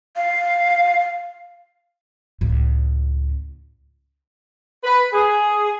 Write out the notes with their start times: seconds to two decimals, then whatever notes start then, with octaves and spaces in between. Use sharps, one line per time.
0.16 F5
2.41 C#2 A2
4.84 B4
5.13 G#4